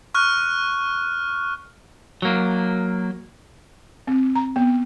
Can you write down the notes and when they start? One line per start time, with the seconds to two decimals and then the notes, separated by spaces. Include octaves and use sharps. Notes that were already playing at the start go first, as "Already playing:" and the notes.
0.15 C#6 F6 F#6
2.22 F#3 A#3
4.07 C4
4.35 A#5
4.56 B3